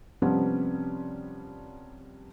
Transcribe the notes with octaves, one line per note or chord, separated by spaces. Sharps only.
C3 F3 G3 B3 C#4